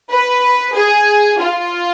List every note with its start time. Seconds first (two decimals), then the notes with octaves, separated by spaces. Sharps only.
0.11 B4
0.75 G#4
1.40 F4